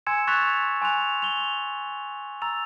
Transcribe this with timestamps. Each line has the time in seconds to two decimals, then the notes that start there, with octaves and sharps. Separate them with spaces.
0.07 G#5 C6 E6 G#6 C#7 E7
0.27 C6 C#6 F#6 A6 B6 F7
0.82 G#5 C6 F#6 F7
1.22 F7 G7
2.42 A#5 E6 A6 F7